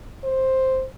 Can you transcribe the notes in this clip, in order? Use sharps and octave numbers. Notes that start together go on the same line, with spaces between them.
C5